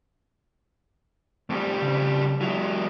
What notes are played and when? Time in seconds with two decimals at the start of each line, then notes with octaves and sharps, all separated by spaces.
1.50 F2 G3 A3
1.82 C#3
2.41 F#3 G#3 E4 G4 E5